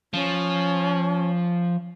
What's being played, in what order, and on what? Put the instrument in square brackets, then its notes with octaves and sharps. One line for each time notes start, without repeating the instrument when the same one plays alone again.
[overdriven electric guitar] F3 [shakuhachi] C#4